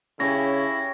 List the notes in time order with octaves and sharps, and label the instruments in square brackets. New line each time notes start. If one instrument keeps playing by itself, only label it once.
[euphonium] C#3 [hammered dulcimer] C#4 G4 C#5 [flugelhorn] E4 [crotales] A#6